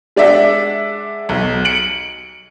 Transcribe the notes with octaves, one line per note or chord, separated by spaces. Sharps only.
G#3 D4 D5 E5 F#5
B1
C#7 D7 F#7